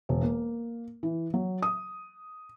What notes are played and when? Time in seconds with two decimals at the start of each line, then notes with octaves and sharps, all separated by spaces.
0.09 E1
0.21 A#3
1.03 E3
1.34 F#3
1.62 D#6